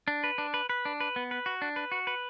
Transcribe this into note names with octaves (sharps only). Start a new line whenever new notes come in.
D4
B4
D4
B4
B4
D4
B4
B3
B4
F#4
D4
B4
F#4
B4